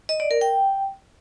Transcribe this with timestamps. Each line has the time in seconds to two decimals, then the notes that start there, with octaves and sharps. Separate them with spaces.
0.09 D#5
0.20 D5
0.31 A#4
0.41 G5